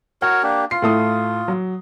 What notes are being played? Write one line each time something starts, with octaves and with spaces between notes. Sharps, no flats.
F#4 A#4 C#5 F#5
A#3 D4 G4
F4 C7
A2 A3 D#6
F#3